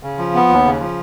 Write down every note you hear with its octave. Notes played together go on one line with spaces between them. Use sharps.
C#3
F3
B3
D#2
C#3
F3